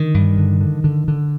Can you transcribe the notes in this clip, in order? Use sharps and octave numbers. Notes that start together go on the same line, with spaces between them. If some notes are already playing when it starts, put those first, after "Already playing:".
Already playing: D3 D#3
G2
D3
D3
D3
D3